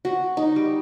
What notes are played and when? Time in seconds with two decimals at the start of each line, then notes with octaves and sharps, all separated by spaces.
0.05 F#4
0.37 D#4
0.56 G3